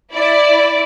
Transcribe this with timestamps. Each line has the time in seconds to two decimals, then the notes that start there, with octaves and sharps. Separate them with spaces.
0.13 E4 D5